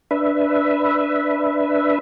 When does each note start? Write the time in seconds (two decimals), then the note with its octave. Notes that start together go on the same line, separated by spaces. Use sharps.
0.11 D4 B4 E5